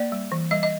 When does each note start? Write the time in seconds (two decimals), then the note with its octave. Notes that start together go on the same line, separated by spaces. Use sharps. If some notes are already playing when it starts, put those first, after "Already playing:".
Already playing: A#3 D5
0.12 G3
0.32 E3
0.51 G3 D#5
0.63 D#5